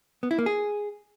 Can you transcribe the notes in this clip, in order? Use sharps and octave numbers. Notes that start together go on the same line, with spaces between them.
B3
E4
A#3
G#4